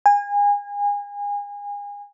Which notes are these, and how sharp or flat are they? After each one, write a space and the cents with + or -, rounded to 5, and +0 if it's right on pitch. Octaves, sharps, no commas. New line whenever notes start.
G#5 -30